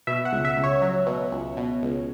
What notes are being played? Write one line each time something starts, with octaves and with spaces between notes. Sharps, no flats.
B2 E5
F#5
C#2
E5
C#2
C#5
F#3
B2
C#2
B2
C#2